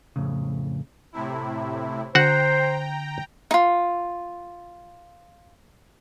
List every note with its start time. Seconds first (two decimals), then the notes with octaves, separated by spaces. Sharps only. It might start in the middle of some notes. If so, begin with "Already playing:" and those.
0.16 F2 A2 C#3
1.13 A2 C3 E4
2.15 D3 F#4 C5 F#5 G5 A#5 F#6
3.51 D#4 F4